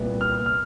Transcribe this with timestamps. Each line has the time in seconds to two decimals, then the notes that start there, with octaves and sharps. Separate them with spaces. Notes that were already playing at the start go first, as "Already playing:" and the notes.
Already playing: C2 A#2 G3 B3
0.21 F6
0.46 F6